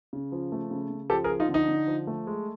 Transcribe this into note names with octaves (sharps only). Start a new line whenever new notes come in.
C#3
F3
A3
C#3
C#3
F3 G4 A4
G#4 A#4
F3
D#4 F4
D3
D#4
D3
F3
A3
G#3